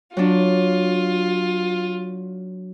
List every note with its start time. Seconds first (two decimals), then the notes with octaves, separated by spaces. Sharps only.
0.17 F#3 D4 F4